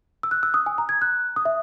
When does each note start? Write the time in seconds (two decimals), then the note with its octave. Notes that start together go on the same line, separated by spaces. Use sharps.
0.23 E6
0.31 F#6
0.43 E6
0.54 D#6
0.66 G#5
0.78 A#5
0.89 G#6
1.02 F#6
1.36 D#6
1.45 E5